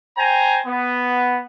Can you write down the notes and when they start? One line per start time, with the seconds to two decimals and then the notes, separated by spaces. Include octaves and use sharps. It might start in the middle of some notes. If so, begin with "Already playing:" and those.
0.18 C5 G5 G#5 A#5
0.67 B3